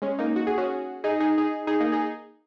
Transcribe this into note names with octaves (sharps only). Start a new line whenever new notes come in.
G#3 C#4
A#3 D#4
F#4
G#4
C#4 F#4
D#4 G#4
D#4 G#4
D#4 G#4
D#4 G#4
A#3 D#4
D#4 G#4